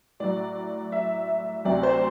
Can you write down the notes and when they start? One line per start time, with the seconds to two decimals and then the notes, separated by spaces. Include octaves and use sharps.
0.20 A2 F#3 D5
0.92 E5
1.65 D2 C3 F#3 D5
1.83 C5